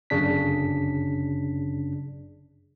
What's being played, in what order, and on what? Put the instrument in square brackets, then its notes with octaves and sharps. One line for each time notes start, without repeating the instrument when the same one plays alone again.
[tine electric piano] G1 F#2 C#3 D4 B6